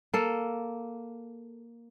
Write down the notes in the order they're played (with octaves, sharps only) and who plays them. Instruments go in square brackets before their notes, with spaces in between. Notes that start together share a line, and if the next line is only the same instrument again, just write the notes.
[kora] A#3 A4